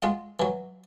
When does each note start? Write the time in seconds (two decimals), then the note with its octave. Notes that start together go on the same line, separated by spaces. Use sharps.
0.02 G#3 F4 D#5 F#5
0.40 E3 F#3